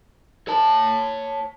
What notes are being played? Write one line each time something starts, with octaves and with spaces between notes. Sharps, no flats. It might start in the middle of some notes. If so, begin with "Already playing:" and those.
C#5 A5